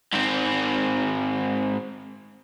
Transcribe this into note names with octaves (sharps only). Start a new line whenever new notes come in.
G#2 C4